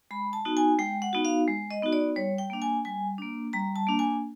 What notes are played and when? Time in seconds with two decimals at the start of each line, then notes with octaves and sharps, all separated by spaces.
0.11 G#3 B5
0.33 A5
0.45 B3 D#4 F#4
0.57 G#5
0.79 G#3 G5
1.02 F#5
1.13 B3 D#4 F#4
1.25 F5
1.48 G#3
1.71 D#5
1.82 B3 D#4 F#4
1.93 D5
2.16 G3 C#5
2.38 G5
2.50 A#3 D4
2.62 G#5
2.85 G3 G#5
3.18 A#3 D4
3.53 G3 A#5
3.76 A5
3.87 A#3 D4
3.99 G#5